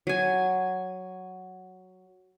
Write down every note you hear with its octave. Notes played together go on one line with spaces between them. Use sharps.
F#3 G#5